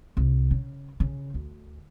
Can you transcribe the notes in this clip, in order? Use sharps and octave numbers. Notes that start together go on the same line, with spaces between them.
C2
C#3
C#3
D2